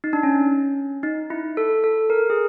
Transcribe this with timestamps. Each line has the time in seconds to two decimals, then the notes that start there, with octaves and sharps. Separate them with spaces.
0.04 D#4
0.13 D4
0.23 C#4
1.03 D#4
1.30 E4
1.57 A4
1.84 A4
2.10 A#4
2.30 G#4